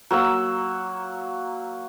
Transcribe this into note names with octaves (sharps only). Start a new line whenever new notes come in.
F#3 A#3 E6